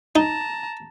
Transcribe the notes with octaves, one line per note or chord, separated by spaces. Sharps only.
D#4 A5 A#5